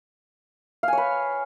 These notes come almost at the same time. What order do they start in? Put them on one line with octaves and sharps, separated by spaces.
F5 G#5 C#5 B4